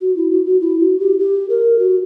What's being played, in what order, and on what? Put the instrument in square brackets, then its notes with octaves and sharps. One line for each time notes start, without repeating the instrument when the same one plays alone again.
[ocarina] F#4
E4
F#4
F#4
E4
F#4
G4
G4
A#4
F#4